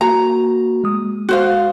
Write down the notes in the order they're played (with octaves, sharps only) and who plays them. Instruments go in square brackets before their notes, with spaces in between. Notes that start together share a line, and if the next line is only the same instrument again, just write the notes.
[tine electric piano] A#3 F#4 [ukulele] A#5
[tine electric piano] G#3 D#6
[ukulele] F#4 C5 F5